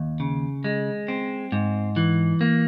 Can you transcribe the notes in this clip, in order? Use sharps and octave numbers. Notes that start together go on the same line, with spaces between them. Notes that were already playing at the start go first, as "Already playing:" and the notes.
Already playing: D#2
C#3
G#3
C4
G#2
E3
A#3